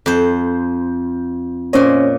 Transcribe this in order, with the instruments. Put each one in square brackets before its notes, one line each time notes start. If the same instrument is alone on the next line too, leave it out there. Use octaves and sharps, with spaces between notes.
[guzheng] F2 C5
[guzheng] A#2 D#5 [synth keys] C#4 C5 C#5